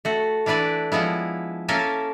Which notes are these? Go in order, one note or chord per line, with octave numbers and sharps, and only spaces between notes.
A3 F#4
E3 D4 E4 B4 D5
F3 G#3 B3 E4
A#3 C#4 A4 A#4 E5 G#5